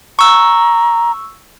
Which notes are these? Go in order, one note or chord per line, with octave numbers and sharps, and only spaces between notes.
A#5 C#6 E6